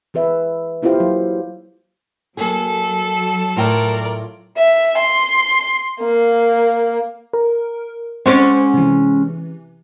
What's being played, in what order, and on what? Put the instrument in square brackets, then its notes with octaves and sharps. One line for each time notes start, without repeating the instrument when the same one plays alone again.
[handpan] E3 G#4 B4 E5
A#3 E4 F4 G4 C5 F5
F#3
[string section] F#3 [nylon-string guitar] A#3 G#4 [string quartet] A4
[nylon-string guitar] A2 F4 G5 [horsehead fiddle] A#4 D5
[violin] E5
C6
A#3
[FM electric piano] A#4
[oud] G#3 C#4 D5 [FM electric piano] C4 C5 F#5
[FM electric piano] C3 E3